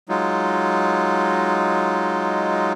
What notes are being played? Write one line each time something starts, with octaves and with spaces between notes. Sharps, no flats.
F#3 G#3 D#4 F4